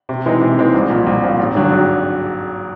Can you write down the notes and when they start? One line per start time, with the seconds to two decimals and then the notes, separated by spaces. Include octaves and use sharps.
0.09 C3
0.26 E3 G#3 C4 D#4
0.41 C3
0.58 E3 G#3 C4 D#4
0.74 C2
0.90 A#2 F3
1.06 C2
1.23 A#2 F3
1.39 G#1
1.55 G2 D3 F#3
1.71 G#1